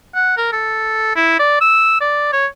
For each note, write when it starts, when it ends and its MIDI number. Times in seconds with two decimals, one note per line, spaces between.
0.15 0.37 78
0.37 0.49 70
0.52 1.14 69
1.15 1.37 64
1.39 1.60 74
1.61 2.00 88
2.01 2.31 74
2.33 2.46 73